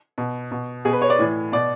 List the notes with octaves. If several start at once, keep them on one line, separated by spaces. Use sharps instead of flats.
B2
B2
B2 G#4
B4
C#5
D5
A2 E3
B2 D5